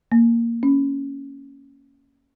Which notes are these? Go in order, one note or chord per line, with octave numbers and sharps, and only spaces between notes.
A#3
C#4